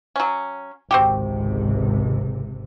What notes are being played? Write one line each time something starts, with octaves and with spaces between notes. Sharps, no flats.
F#3 C#4
G#1 C#2 C3 C4 F#4 G4